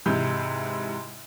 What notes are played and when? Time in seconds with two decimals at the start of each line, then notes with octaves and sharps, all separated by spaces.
0.06 G#2 C3 E3 G6